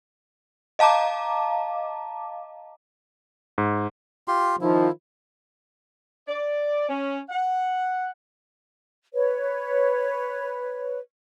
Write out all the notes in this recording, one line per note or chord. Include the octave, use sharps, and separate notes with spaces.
D#5 F5 A5 A#5 D6
G#2
F4 G4 C6
D#3 F3 E4
D5
C#4
F#5
B4 C#5